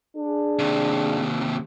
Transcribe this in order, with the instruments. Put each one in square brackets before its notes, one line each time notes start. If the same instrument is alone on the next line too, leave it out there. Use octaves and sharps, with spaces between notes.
[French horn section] D4 G#4
[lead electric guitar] D#2 C3